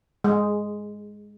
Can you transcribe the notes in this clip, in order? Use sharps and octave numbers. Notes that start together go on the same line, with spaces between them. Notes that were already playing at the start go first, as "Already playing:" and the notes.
G#3